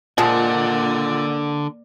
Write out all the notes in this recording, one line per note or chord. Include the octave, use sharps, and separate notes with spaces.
A#2 D3 F3 G#3 A#3 D5 F#5